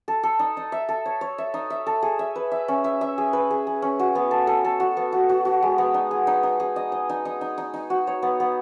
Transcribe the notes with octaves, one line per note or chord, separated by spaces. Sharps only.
A4
A4
D#4
D#4
E5
A4
C#5
C#5
E5
D#4
E5
A4
G#4
E5
B4
E5
C#4
E5
E5
G#4
B4
G#4
G#4
C#4
F#4
B3
A4
A4
A4
F#4
B3
F#4
F#4
F#4
G#3
B3
D#4
G#4
D#4
D#4
G#4
D#5
D#5
D#4
D#4
D#4
D#4
D#4
F#4
C#5
B3
B3